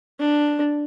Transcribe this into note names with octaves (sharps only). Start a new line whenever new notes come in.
D4